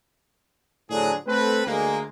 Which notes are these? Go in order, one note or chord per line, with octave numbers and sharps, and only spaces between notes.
A2 D3 F3 F#3 D4 G#4
A3 C4 A4 B4
D2 G#3 A#3